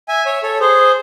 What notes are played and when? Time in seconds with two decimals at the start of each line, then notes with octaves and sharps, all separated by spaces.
0.08 E5 G#5
0.26 C#5 E5
0.43 A4 C#5
0.60 G#4 C5